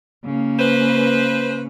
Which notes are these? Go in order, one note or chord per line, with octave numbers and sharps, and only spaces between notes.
C#3 A#3
B4 C5